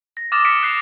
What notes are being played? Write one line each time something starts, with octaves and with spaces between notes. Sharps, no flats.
A#6
D6 D#6 F6 A6 A#6 E7
F6 B6 C#7 D7 E7
F#6 C7 F7